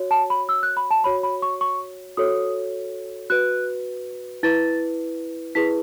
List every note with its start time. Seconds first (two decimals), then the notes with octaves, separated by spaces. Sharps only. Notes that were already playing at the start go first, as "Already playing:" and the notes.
Already playing: F#4 C#5
0.11 A5
0.30 B5
0.49 E6
0.63 F#6
0.77 B5
0.91 A5
1.04 F#4 C#5 B5
1.23 B5
1.42 C#6
1.61 C#6
2.17 F#4 A4 C#5 D#6
3.30 F#4 B4 F#6
4.43 E4 B4 A6
5.55 E4 G#4 B4 B6